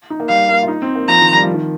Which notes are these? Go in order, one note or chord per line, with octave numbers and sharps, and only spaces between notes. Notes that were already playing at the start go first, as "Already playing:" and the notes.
D#4
A#3
G3 F5
A#3
F4
D#4
C4
A#3
F3 A#5
D#3
G3
F3
D#3